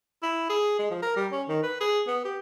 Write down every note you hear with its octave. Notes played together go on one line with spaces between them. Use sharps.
E4
G#4
G#3
F3
A#4
G3
C#4
D#3
B4
G#4
B3
G4